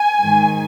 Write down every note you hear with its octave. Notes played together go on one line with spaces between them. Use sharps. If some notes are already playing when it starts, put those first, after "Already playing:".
Already playing: G#5
G#2 D#3